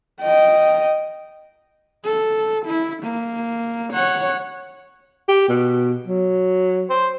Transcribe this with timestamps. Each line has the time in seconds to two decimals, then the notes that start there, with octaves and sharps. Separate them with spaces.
0.21 D#5 G5
2.04 A4
2.66 E4
3.03 A#3
3.93 C#5 F#5
5.28 G4
5.49 B2
6.07 F#3
6.90 C5